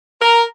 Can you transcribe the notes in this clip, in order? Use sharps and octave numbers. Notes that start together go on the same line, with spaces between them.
A#4